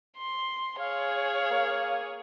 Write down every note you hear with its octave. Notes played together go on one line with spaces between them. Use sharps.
C6
G#4 C#5 F5
A#3